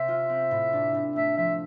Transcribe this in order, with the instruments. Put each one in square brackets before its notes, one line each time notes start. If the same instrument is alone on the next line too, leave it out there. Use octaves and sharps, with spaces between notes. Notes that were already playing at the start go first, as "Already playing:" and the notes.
Already playing: [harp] C3 C4 [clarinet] E5
[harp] F4
C4
A2
D4
A2
[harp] A3 [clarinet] E5
[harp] F3 [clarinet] E5